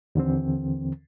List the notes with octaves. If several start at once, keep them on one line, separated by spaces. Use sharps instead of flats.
D#2 D3 E3 C4